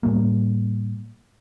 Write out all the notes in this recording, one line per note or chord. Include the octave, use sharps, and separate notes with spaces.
A2 G3 A#3